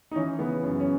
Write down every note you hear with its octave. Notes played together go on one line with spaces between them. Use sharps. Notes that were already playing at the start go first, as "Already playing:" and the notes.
D#4
E3 C#4
C#3 B3
F#2
C#4